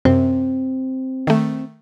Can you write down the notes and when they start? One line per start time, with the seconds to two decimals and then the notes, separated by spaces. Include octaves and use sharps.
0.05 F#2 C3 C4
1.27 D#3 A3